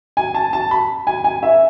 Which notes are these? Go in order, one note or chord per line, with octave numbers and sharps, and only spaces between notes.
G#5
A5
A5
B5
G#5
G#5
E5